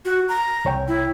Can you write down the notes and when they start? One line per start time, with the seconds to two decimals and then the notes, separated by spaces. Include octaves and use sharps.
0.05 F#4
0.29 A#5
0.65 C2 C#5 G5
0.88 E4